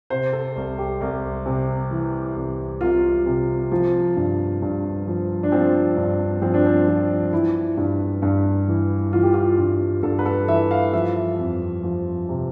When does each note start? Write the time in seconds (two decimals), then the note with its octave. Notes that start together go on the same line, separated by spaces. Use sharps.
0.10 C3 C5
0.33 A4
0.56 C2
0.78 G4
1.01 C2
1.46 C3
1.91 E3
2.36 C2
2.81 C2 F4
3.26 C3
3.72 F3
4.17 G2
4.62 G2
5.07 F3
5.43 D4
5.52 F3 C4
5.97 G2
6.42 F3 C4
6.54 D4
6.66 C4
6.88 F3
7.32 E3 E4
7.77 G2
8.22 G2
8.68 E3
9.13 E3 F4
9.23 G4
9.34 F4
9.58 G2
10.03 G2 A4
10.19 B4
10.26 A4
10.48 E3 E5
10.71 F5
10.93 F3 E5
11.38 F2
11.83 F3
12.29 C3